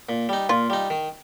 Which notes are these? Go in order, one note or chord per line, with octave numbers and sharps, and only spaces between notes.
A#2
G3 D#4
A#2 F4
G3 D#4
D#3